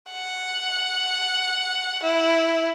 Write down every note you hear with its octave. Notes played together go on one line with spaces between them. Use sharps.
F#5
E4